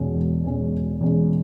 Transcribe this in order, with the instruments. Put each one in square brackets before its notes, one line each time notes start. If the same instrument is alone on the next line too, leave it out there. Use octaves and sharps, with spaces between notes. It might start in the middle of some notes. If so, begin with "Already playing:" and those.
Already playing: [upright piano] E1 E2 B2 G#3 C#4
E1
E2 B2 G#3 C#4
E1
E2 B2 G#3 C#4